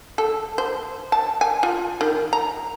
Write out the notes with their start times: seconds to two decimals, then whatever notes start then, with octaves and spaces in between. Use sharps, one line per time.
0.18 A4
0.58 C5
1.12 A5
1.41 G#5
1.63 F4
2.01 D#3
2.33 A#5